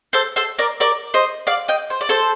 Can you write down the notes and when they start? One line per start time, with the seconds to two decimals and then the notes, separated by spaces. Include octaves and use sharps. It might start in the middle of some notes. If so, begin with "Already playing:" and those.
0.13 A4 C5
0.36 A4 C5
0.59 A#4 D5
0.80 A#4 D5
1.14 C5 D#5
1.47 D5 F5
1.68 D#5 G5
1.90 C5
2.01 D5
2.09 A4 C5